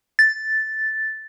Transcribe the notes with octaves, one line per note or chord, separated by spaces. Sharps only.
A6